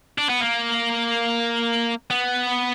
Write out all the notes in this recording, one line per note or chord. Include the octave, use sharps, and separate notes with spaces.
D4
B3
A#3
B3